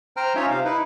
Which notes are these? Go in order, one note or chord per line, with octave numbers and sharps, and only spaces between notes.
C5 G5 A#5 F6
C#4 D#4 F4 C#5 D#5 E5
C3 C5 F5
D#4 E4 B4